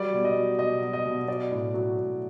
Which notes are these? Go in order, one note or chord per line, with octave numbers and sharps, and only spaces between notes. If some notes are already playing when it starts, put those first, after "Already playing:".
Already playing: F#3 G3 D5
B2
D#5
F#3
B2 D#5
F#3
D#5
B2
F#3 D5
A2
F#3
A2